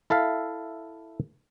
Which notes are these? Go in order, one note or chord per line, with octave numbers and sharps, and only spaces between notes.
E4 A4 E5 F5